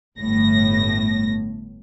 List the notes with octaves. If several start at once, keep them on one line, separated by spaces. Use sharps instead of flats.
G1 A2 A#6